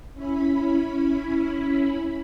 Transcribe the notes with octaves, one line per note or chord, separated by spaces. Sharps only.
C#4 E4 B5